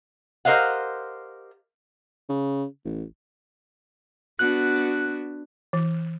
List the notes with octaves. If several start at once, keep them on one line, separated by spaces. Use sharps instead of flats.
G4 A#4 C5 D#5 F5 F#5
C#3
A1
B3 D4 F#4 F#6
E3